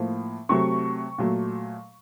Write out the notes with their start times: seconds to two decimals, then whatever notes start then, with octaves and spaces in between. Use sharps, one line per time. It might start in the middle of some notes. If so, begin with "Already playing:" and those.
Already playing: A2 F3 A#3
0.49 C3 F#3 A3 C#6
1.18 A#2 F#3 A3